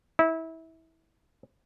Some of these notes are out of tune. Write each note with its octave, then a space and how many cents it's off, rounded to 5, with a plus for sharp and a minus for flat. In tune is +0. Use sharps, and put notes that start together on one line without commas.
E4 -25